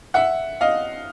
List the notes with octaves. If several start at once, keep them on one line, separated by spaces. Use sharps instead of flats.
E5 F#5
D#5 F5